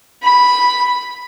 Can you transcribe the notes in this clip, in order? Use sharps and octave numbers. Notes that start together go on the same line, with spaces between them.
B5